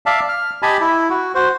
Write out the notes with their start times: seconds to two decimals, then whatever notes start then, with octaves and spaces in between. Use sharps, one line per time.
0.06 D5 E5 F5 A5
0.29 F6
0.62 G4 D#5 G#5 A5 B5
0.81 E4
1.10 F#4
1.35 F#4 C5